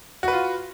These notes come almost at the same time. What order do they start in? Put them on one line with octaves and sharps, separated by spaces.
F#4 B4 F4